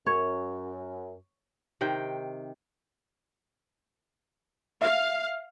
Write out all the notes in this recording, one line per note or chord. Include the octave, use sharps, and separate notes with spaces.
F#2 C#5
C3 D#3 C5 G5
E5 F5